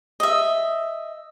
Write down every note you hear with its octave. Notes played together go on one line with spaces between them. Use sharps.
D#5 E5